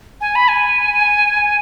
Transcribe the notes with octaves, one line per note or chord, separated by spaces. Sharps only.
G#5
B5
G#5